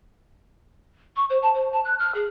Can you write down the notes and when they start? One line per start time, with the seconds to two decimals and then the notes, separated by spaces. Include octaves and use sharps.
1.16 C#6
1.29 C5
1.42 A5
1.54 C5
1.72 A5
1.84 F#6
1.99 F6
2.14 G#4